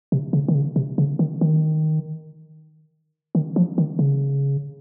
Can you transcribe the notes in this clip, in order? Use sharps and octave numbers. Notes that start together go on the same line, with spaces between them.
C3
C#3
D#3
C#3
C3
C#3
D#3
D#3
D#3
F3
D#3
C#3